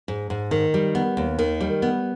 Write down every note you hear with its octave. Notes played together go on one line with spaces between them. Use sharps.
G#2
G#2
D#3
G3
B3
D#2
D#3
G3
B3